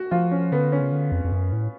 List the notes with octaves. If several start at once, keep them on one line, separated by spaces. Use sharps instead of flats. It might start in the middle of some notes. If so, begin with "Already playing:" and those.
Already playing: F#4
F3 F4
C#4
D3 B3
C#4
C#3
D3
F2
F2
F#2
A2